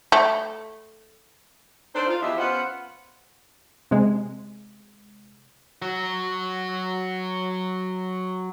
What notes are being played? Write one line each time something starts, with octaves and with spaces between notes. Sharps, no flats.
A3
D4 D#4 A4 C5
F4
E2 F3 E4 G4 D#5 E5
B3 C#4 F4 C5 F#5
C3 G#3
F#3 F#4